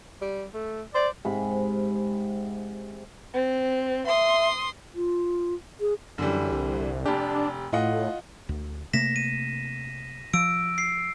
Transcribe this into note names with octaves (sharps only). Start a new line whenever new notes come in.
G3
A3
C5 D5
G#2 C3 B5
C4
E5 C6 D#6
F4
G#4
F#2 D3 E3 G3
C2
F1 D4 G4
A2 F4 D#5 F#5
D2
C3 A3 A#3 A#6 B6 E7
D#7
F3 E6 D7
C7